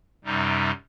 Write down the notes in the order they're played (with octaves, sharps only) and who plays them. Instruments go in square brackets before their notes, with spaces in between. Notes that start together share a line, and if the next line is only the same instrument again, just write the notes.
[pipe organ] F#2 C3 G3 D#4